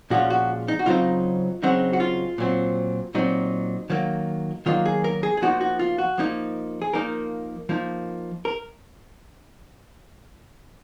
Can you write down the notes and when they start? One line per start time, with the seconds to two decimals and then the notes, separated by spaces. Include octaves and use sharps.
0.10 A#2 F3 G#3 C#4 F#4
0.30 F#4
0.68 D#4
0.79 F#4
0.86 C#3 F#3 C4 D#4 F4
1.63 C#3 F#3 C4 D#4 F#4
1.93 F#4
2.00 F4
2.38 A#2 F#3 C4
3.15 A#2 F#3 C4 D#4
3.90 D#3 F#3 A#3
4.66 D#3 F#3 A#3 F4
4.86 G#4
5.04 A#4
5.23 G#4
5.37 G#4
5.42 F3 A#3 D#4 F#4
5.61 F#4
5.79 F4
5.98 F#4
6.18 F3 A#3 D#4
6.82 G#4
6.93 F3 A#3 D#4 A#4
7.69 F3 A#3 D#4
8.45 A#4